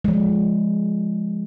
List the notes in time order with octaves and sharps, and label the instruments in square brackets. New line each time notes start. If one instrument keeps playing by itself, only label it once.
[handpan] F3 G#3